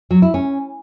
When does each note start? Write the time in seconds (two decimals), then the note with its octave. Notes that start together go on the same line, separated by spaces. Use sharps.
0.11 F#3
0.22 E4
0.34 C#4